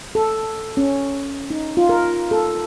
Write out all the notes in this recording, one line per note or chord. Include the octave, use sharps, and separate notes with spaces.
A4
C#4
D#4
F4
A#4
A4